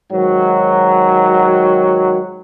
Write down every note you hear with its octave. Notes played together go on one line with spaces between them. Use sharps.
G#2 D#3 F#3